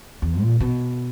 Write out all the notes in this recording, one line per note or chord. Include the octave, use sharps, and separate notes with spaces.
E2
A#2
B2